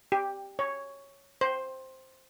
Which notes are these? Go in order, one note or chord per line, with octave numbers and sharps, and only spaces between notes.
G4
C#5
C5